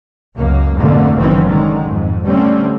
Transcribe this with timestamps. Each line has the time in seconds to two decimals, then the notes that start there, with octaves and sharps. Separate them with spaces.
0.36 C#2 F#2 A#3
0.75 F2 G#2 B2 D3 A3 A#3
1.16 F#1 F#2 D#3 E3 C4 C#4
1.46 D3 D#3 G#3
1.86 F2 G#2
2.26 D3 G3 A3 C4 C#4